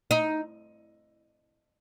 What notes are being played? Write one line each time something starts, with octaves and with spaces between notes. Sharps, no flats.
D#4